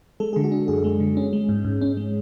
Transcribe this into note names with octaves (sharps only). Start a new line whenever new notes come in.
G#3 A4
D3 G#4
F#4
D4
F#2 G#4
G#3
D3
C#4
G#3
G#2
G#2
C#4
G#3